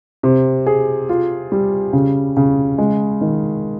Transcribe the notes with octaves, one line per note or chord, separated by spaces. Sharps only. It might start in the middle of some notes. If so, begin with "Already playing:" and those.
C3
G#4
F4
G3
C#3
C#3
G#3
D#3